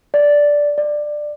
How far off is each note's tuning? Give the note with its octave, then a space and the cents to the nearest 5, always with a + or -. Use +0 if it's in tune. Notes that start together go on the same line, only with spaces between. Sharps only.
D5 -5
D5 +15